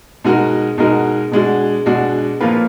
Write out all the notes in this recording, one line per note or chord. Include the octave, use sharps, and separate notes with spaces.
B2 G#3 D#4 F#4 A#4
B2 G#3 D#4 F#4 A#4
B2 G#3 D4 F#4
B2 G#3 D4 F#4
A#2 F3 A#3 F4 B4